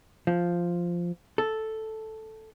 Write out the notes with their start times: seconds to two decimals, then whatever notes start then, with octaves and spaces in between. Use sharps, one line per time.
0.27 F3
1.38 A4